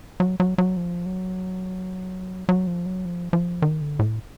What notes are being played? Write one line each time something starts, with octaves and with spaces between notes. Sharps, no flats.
F#3
F#3
F#3
F3
F#3
F#3
F3
F#3
F3
F3
D#3
D3
A2